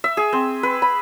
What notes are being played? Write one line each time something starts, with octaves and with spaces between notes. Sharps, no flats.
E5
G#4
C4
B4
B5